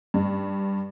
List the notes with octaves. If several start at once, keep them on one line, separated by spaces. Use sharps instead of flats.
G2